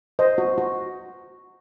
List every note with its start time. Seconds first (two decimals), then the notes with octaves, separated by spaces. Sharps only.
0.19 C5 D#5
0.38 F#4
0.58 F#4